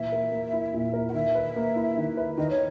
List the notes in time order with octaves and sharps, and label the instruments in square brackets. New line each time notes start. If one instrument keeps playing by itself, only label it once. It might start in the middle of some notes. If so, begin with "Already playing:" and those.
Already playing: [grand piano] A#2 E3 [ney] E5
[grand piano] A#4
A#3
E4
A#2
A#4
[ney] F#5
[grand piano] D#3 [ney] E5
[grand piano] B4
A#3
E4
D#3
B4
[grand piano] D#3 [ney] D#5
[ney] C#5